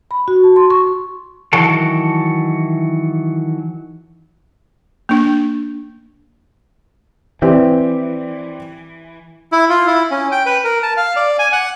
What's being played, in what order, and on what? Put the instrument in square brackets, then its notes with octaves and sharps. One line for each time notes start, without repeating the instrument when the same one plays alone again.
[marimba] B5
F#4
A5
C6
C#6
[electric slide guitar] D#3 E3 F#3 F#4 A4 A5
[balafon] A#3 D4
[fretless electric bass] E3 [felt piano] C4 G4 D5
[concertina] E4
F4
E4
C#4
G5
B4
A#4
A5
F5
D5
G#5
F#5